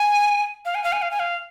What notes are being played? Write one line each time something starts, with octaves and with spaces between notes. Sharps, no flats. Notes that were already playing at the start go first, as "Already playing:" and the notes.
Already playing: G#5
F5
G#5
F5
G#5
F5
G#5
F5